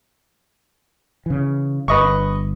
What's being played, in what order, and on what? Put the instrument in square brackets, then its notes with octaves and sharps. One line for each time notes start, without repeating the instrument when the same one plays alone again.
[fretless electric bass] C#3 E3
[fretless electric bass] G1 [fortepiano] B4 D#5 C#6